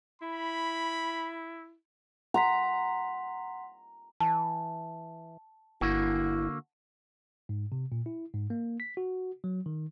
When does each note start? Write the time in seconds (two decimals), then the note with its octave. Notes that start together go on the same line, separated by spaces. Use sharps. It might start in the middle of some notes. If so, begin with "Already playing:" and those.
0.22 E4 B5
2.34 F#5 A#5 C6 B6
4.20 E3 A5
5.81 G1 D3 A#3 E4 F#4
7.49 G#2
7.72 C3
7.92 A#2
8.06 E4
8.34 G#2
8.50 A#3
8.80 B6
8.97 F#4
9.44 F#3
9.66 D#3